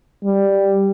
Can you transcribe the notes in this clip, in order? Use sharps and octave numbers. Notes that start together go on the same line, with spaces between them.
G3